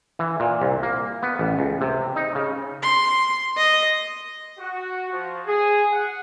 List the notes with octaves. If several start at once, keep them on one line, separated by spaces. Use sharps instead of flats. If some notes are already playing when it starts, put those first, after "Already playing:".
E3
A#2
C2
A#3
B3
A1
C#2
C3
D#4
C#3
C6
D#5
F#4
F3
G#4
F#5